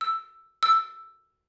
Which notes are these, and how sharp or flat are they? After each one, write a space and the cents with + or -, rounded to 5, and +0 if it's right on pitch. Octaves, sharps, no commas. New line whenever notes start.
E6 +5
E6 +5